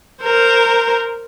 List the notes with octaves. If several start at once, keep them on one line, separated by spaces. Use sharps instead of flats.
A#4 C5